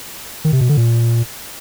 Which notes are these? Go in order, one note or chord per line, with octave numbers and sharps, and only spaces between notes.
D#3
C3
B2
D3
A#2